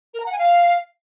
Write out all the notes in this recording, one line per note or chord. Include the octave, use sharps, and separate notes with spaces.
A#4
A#5
F#5
G#5
F5